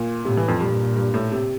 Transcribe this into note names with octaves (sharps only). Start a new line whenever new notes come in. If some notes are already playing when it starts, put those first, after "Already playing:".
Already playing: A#2
A2 C3
E3
F2
G2 A#2
G2
A2
C3